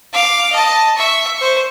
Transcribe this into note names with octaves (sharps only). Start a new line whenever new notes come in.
F5 D6
D#5 A5
E5 C#6
C5 C#6